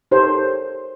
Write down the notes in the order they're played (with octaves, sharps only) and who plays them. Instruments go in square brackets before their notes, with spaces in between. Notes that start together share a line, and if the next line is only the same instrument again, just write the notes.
[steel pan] D#4 G4 A4 A#4 C5 C#5